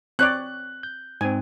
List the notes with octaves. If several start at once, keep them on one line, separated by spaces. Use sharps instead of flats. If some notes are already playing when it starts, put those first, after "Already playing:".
C4 C#5 D5 F#6
G6
G#2 C4 G#5